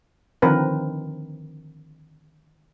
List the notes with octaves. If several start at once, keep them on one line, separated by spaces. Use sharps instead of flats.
D3 D#3 F3 C4 A#4 B4